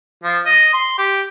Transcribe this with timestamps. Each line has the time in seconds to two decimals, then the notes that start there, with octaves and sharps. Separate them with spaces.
0.24 F3
0.46 D#5
0.74 C6
0.98 G4